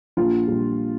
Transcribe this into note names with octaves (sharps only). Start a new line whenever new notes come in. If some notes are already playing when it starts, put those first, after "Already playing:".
A#1 F4
A#2 G3